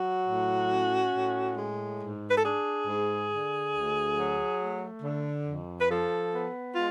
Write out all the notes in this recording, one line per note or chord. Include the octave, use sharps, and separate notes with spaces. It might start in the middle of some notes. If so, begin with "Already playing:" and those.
Already playing: F#3 F#4
A2
C#4
A2
G#3
G#2
B4
A4
D4 G#4
G#2
D3
D2
F#3
A3
D3
F2
B4
F3 A4
B3
G#3 F4